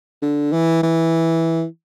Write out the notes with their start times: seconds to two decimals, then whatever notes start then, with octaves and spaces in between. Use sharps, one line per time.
0.22 D3
0.53 E3
0.83 E3